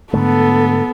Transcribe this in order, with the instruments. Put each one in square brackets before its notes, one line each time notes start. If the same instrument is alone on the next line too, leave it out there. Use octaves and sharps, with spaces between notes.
[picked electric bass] G#2 D3 A3 [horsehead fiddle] B3 A4